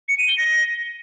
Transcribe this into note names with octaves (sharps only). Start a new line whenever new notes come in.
C#7
D#7
G7
A#6